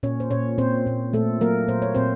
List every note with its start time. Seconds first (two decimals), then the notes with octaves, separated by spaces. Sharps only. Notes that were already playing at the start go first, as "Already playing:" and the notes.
0.03 A#2 C#4 C#5
0.20 C5
0.31 A#2 C#4 C#5
0.58 A#2 C4 C5
0.87 A#2
1.13 A#2 A3 A4
1.41 F#3 A#3 A#4
1.68 A#2 C5
1.82 C#5
1.95 A#2 C4 C5